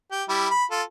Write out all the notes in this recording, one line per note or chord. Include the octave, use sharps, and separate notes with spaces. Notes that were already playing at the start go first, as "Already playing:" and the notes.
G4
G3 E4
B5
F4 A4